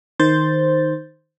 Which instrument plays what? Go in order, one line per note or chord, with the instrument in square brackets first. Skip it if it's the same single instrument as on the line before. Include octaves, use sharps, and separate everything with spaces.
[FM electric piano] D#3 C5 G6 A6